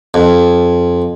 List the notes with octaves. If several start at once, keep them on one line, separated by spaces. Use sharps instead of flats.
F2